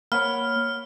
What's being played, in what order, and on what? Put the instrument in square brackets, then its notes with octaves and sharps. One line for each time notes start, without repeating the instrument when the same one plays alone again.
[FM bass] A#3 [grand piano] C#5 F#5 B5 [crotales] F6